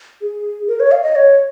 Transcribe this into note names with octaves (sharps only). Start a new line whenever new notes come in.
G#4
A#4
C#5
F5
D#5
C#5